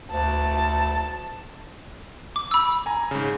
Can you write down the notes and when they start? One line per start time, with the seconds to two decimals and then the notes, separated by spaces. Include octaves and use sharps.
0.12 D2 A5
2.36 D6
2.51 B5 E6
2.86 G#5 A#5
3.11 G#2 C#3